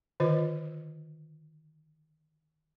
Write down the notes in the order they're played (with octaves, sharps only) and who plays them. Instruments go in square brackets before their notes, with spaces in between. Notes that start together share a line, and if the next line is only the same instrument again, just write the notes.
[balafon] D3 D#3 F4 C5 D#5